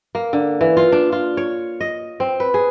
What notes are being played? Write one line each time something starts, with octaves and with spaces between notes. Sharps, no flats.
A#3
D3
E3
F4
D4
F4
C#5
D#5
C4
B4
G#4